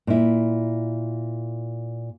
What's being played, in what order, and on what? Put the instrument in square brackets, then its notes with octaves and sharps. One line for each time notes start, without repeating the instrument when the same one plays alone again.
[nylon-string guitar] A#2 E4